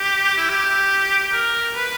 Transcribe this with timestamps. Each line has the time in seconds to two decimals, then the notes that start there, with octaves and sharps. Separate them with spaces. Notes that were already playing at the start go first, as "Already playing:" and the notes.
Already playing: G4
0.38 E4
0.50 G4
1.33 A#4
1.75 B4